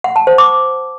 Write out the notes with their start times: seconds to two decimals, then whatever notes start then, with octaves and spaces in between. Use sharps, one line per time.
0.04 F#5
0.16 A5
0.27 C5
0.38 D6